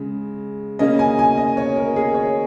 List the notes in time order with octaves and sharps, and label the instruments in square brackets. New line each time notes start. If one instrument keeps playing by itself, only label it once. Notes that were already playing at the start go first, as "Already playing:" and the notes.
Already playing: [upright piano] C#3 G#3
C#3 A#3 C#4 D#5
G#5
G#5
D#5
C#5
A#4
G#4
C#5